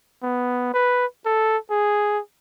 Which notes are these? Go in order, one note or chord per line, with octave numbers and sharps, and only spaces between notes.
B3
B4
A4
G#4